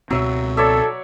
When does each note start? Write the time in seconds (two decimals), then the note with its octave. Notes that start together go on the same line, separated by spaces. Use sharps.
0.10 C#2 B2 F#3 C4 E5
0.57 A4 C#5 D5 E5